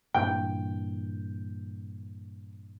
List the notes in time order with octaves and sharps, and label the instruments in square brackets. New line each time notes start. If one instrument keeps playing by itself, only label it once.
[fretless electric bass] G2 A#2 E3 [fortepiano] G5